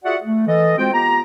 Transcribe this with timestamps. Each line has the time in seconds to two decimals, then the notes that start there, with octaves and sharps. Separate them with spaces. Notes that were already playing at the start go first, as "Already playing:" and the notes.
0.04 F4 F#4 G#4 D5 E5 F#5
0.24 A3
0.47 E3 A4 D#5
0.78 G#3 C4 F4 F#4 C5 G5
0.93 B3 F4 G4 A#5